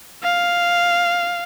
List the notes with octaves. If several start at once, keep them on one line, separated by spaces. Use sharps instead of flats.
F5